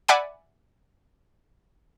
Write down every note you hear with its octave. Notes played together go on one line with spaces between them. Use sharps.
D5 E5 F#5 G#5 B5 D6